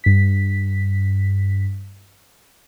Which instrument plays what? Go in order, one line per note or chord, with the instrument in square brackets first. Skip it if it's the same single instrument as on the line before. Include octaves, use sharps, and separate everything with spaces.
[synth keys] G2 B6